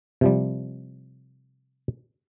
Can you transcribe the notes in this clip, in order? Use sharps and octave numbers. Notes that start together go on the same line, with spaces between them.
C3 F3 G3